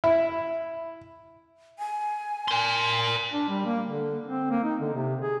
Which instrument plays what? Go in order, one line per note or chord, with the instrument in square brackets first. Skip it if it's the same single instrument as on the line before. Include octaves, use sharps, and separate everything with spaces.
[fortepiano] E4
[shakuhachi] G#5
[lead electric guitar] A#4 C6
[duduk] D4
G3
A#3
D3
C4
A#3
D#4
D3
C3
G#4